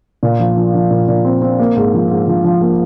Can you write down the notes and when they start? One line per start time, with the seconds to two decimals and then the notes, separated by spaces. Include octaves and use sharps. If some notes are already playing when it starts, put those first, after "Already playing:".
0.23 A#2
0.40 F3
0.57 F3
0.75 F3
0.91 A#2
1.08 A#2
1.24 C4
1.42 C4
1.59 A#3
1.76 G#2
1.94 F3
2.11 G#2
2.28 F3
2.44 F3
2.61 A#3